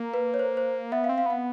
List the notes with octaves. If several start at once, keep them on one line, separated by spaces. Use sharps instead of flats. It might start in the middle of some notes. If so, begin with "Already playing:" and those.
Already playing: A#3
B4
C#5
C5
C5
B3 E5
F5
C4
F5
B3 F#5